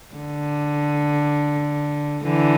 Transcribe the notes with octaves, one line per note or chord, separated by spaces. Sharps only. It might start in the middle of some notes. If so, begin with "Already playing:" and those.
D3
D3 E3